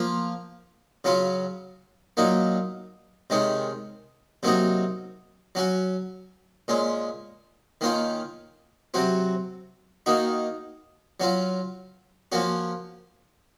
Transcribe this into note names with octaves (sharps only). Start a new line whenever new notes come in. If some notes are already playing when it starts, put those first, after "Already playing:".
Already playing: F3 A#3 F4
C#3 F#3 C#4 F4
A#2 F#3 A#3 D#4
C3 D#3 G#3 C#4
C3 F#3 A#3 D#4 F#4
F#3 C#4 F#4
A#2 G#3 C#4
D#3 A#3 C#4 F4
C3 F#3 C4 F#4
D#3 A#3 D#4 F#4
F#3 C#4 F4
F3 A#3 C#4 F#4